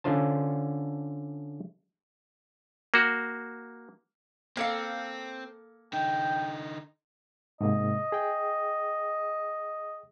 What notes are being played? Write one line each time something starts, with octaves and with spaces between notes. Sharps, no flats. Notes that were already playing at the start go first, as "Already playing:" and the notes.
D3 C#4 D4 F4 C5 A5
A#3 F#4
A#3 C4 A4 F5
D3 D#4 G5
G#2 C3 A#3 D#5
G#4 G5